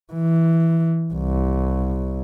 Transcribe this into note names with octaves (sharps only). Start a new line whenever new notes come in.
E3
C2